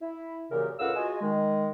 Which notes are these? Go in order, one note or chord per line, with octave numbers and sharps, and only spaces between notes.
E4
F#2 A#2 C#3 E3 G4 A#4
C#2 A2 A#4 F5 F#5 E6
G#3 F4 F#4 G#4 D#5 G#5
D#3 G#3